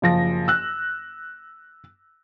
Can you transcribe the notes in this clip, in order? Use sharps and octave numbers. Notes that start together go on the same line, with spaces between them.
F#1 F3 A#6
E6 F#6